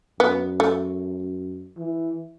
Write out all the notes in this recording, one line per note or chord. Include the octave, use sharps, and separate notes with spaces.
F#2 B3
A3
E3